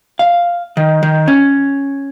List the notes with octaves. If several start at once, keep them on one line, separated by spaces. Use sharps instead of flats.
F5
D#3
D#3
C#4